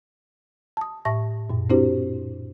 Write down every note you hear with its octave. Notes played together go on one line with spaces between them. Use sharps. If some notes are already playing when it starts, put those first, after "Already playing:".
A5 D#6
A2 E5 A5 C#6 A#6
F#2 A#2
C4 D4 E4 F#4 G4 C5